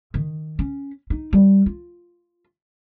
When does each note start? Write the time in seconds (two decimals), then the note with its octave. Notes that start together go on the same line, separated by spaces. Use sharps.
0.14 D#3
0.59 C#4
1.10 D#4
1.33 G3
1.66 F4